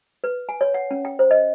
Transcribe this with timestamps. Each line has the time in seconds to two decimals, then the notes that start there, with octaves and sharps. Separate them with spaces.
0.24 B4
0.49 G#5
0.61 C#5
0.74 F#5
0.91 C#4
1.05 G5
1.19 C5
1.31 D#5